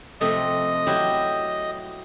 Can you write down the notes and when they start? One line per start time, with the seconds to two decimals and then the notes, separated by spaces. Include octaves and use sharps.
0.21 F2 C3 A3 D#5
0.87 F#3 E4 G4